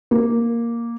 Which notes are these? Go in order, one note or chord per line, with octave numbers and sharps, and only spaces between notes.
A#3